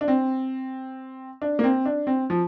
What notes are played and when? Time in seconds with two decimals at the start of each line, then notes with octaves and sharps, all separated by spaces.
0.01 D4
0.08 C4
1.42 D4
1.59 A#3
1.64 C4
1.86 D4
2.07 C4
2.30 F3